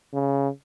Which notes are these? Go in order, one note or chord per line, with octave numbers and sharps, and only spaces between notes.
C#3